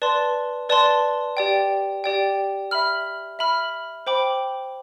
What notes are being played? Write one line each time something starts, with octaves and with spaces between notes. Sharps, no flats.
B4 D5 A5 C6
B4 D5 A5 C6
G4 D5 G5
G4 D5 G5
E5 B5 F6
E5 B5 F6
C5 G5 B5 D6